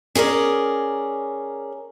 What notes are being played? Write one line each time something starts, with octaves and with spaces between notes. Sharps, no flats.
C#4 G#4 A#4 D5